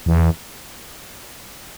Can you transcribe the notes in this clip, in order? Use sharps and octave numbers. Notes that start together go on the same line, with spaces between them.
E2